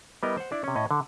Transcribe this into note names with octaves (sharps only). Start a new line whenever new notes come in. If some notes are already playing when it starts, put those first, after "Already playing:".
G3 B3 E4 A#4 D#5
C5 F#5
D4 E4 D5
C3 C#4
A2 C#4 D#5
D3